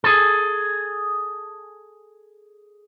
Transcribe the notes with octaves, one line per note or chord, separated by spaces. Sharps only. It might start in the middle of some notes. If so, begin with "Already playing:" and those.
G#4 A4